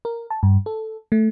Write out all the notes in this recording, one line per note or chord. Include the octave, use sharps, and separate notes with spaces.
A#4
A5
G2
A4
A3